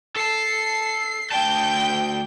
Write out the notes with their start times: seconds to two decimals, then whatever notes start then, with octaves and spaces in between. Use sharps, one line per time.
0.16 A4 A5 C7
1.31 D2 G5 A5 G6